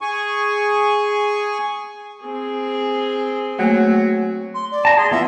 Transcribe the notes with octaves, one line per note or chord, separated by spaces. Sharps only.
G#4 G#5 C#6
C4 G#4
F#3 A3 A#3 G#5
C6
D5
A5 A#5
G#4 C6
E3 B3 F4 E5